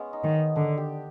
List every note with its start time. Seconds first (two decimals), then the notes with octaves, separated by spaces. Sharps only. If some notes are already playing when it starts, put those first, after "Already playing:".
Already playing: G#3 B3 C#4
0.13 D#4
0.24 D#3
0.35 B3
0.56 D3 D4
0.77 G4